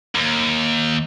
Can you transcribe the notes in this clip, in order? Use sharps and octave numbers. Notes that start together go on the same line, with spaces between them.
D#2